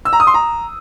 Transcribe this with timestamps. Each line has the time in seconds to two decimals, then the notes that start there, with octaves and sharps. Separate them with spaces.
0.05 E6
0.13 A#5
0.20 D#6
0.27 C6
0.34 A#5